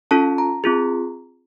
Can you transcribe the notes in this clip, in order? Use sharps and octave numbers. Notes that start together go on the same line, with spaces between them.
C#4 F4 A4 A5
A#5
C4 F4 G#4